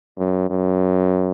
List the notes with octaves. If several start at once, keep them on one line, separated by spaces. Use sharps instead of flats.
F#2
F#2